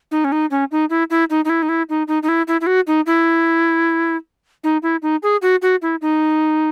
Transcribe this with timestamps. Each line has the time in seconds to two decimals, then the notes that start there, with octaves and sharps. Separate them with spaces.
0.11 D#4
0.24 C#4
0.32 D#4
0.51 C#4
0.71 D#4
0.90 E4
1.10 E4
1.30 D#4
1.45 D#4
1.49 E4
1.62 D#4
1.69 E4
1.89 D#4
2.08 D#4
2.23 D#4
2.28 E4
2.48 E4
2.61 E4
2.67 F#4
2.87 D#4
3.06 E4
4.64 D#4
4.83 E4
5.02 D#4
5.23 G#4
5.42 F#4
5.62 F#4
5.82 E4
6.01 D#4